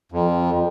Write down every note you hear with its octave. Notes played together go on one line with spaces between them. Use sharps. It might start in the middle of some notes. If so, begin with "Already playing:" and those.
F2